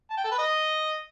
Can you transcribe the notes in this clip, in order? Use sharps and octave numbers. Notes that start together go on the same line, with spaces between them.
A5
G5
A4
B4
D#5